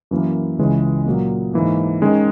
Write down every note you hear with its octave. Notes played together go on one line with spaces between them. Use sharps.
F#2 E3 A#3
C#2 C#3 E3 G#3 C#4
A#2 F#3 A#3
G#2 E3 A#3
D#3 G#3 C#4